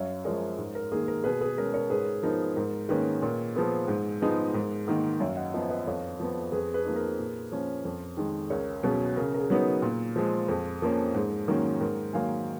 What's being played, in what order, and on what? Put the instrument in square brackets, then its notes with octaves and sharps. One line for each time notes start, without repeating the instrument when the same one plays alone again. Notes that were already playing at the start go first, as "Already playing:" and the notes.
Already playing: [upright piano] F#2 [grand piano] C#5 F5
[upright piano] F3 G#3 [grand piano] A#4 C#5
[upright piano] G#2
[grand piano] A#4
[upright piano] D#3 A#3 [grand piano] G#4
[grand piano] A#4
[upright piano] B2 [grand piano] G#4 B4
[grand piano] G#4 B4
[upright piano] G#3 C#4 [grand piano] A#4
[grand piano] A#4 C#5
[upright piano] G#2 [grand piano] G#4 B4
[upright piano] F3 B3 D#4 [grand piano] A#4
[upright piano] G#2 [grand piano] A#4
[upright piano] D#3 A#3 C#4 [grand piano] G#4 B4
[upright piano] A#2 [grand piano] A#4 C#5
[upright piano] F3 B3 [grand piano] G#4 B4
[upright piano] G#2
F3 G#3 B3 D#4
[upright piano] G#2 [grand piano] A#4
[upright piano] D#3 A#3 [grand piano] D#5 F#5
[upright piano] F#2 [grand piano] C#5 F5
[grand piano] D#5 F#5
[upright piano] F3 B3 [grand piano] D#5 F#5
[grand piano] B4 D#5
[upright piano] F2 [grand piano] C#5 F5
[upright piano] F3 B3
[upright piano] F2 [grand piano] G#4 B4
[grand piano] G#4 B4
[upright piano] F3 A#3 D#4
[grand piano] A#4
[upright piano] A#2
F3 A#3 C#4
F2
D#3 G#3
[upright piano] C#2 [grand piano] A#4 C#5
[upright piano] B2 F#3 C#4 [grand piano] G#4 B4
[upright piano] C#3 [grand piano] A#4
[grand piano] A#4
G#4
[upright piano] F#3 B3 D#4
[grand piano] A#4
[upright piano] A#2
F3 G#3
[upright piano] F2 [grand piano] G#4
[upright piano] F3 A#3 C#4 [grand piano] A#4
[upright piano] G#2 [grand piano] G#4
[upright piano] D#3 F#3 A#3 C#4
[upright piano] G#2 [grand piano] A#4
[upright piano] D#3 F#3 A#3 [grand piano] F5 G#5